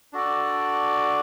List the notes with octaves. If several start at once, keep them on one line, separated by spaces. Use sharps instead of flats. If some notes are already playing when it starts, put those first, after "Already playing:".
D4 F#4 A4 D5